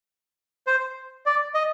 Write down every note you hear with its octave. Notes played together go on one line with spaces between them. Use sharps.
C5
D5
D#5